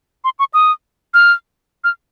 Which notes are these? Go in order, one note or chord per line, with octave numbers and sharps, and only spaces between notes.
C6
C#6
D#6
F6
F6